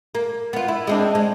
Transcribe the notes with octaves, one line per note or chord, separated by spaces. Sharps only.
A#3
B3 F4
E4
G#3 C4 D4
G#3